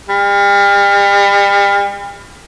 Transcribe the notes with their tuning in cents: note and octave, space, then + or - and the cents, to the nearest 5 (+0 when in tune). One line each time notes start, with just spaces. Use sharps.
G3 +40